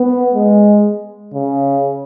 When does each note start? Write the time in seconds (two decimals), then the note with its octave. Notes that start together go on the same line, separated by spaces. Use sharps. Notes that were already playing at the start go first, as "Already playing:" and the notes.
Already playing: B3
0.34 G#3
1.34 C#3